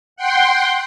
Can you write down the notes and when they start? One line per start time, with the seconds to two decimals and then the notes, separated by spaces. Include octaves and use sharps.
0.16 F#5 G5 C6